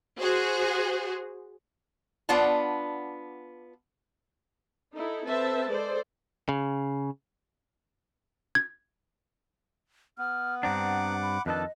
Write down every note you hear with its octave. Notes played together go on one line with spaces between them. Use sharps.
F#4 G#4 C5
B3 D4 F4 D5 F#5 A5
D#4 E4 A4
C4 A4 B4 C5 E5 A5
G#3 A4 C5 D5
C#3
G#6
B3 F6
G2 C4 D4 F#5 A#5 D6
B5
F2 D#3 D4 A4 B4 D#5